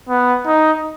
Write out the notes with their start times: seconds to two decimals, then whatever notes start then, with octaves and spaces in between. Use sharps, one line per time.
0.09 B3
0.46 D#4